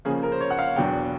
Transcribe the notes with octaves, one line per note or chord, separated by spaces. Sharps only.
C#3 F3 A#3 C#4 G#4
A#4
C5
C#5
F#5
F5
E2 B2 F#3 B3 D4 G5